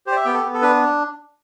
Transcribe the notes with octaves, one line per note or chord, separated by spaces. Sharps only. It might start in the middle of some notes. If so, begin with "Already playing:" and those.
G4 C5
D5
E5
B3 G5
A4
B3
A4
D4 B4